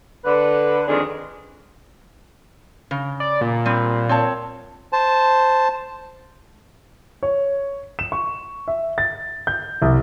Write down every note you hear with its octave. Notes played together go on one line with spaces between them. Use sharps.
D3 B4
F2 D#3 G#3 D4 G#4
C#3
D5
A#2
G3 C4
C4 C#5 A5
C5 A5
C#5
E7
C#6
E5
A6
G6
C2